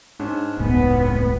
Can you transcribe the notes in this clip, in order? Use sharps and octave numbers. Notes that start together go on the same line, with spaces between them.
G#2 C#4 D4
E1 C#2 A2 G#3 B3